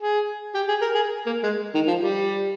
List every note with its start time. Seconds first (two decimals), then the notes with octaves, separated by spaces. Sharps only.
0.02 G#4
0.55 G4
0.69 G#4
0.82 A#4
0.95 G#4
1.26 A#3
1.43 G#3
1.75 D#3
1.88 F3
2.02 G3